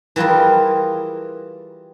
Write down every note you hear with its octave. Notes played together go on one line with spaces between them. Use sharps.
E3 G3 F4 G#4 A#4